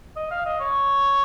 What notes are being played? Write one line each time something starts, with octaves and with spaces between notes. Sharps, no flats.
D#5
F5
D#5
C#5